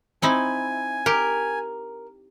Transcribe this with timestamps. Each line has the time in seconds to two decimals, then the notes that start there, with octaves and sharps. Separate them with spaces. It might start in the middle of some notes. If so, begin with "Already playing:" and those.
0.22 C4 D#4 E4 G#5
1.06 G4 A#4